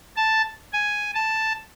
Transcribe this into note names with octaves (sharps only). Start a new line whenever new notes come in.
A5
G#5
A5